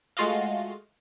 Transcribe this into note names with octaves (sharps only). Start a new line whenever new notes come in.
G#3 A3 F4 F#4 D#5 F5